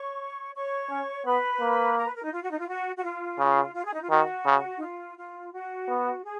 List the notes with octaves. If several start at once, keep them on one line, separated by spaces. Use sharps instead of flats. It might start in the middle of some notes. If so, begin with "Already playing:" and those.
Already playing: C#5 C#6
C#5 C#6
C#4
B3 B4 B5
A#3
A#4 A#5
B4
A#4
D#4
F4
F#4
D#4
F4
F#4
F#4
F4
C#3
F4
G#4
D#4
F4
D#3 F#4
C#3
D#4
F4
F4
F#4
B3
G#4